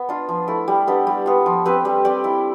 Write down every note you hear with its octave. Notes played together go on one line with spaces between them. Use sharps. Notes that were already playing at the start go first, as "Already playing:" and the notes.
Already playing: B3
D4 F4
F3
A3 E4
G3
B3 D4 G4
G3
B3 F4
F3
C4 G4 B4
G3
C4 G4 D5
E4